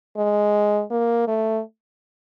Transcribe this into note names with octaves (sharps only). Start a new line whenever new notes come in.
G#3
A#3
A3